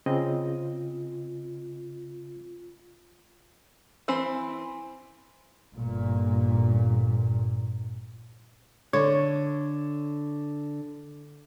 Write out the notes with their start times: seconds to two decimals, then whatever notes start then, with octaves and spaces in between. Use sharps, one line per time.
0.06 C#3 C4 F4 D#5
4.08 E3 C4
5.73 G1 A#2
8.93 D3 C#5